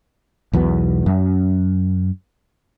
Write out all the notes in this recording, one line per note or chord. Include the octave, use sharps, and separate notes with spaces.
B1 E2 B2 B3
F#2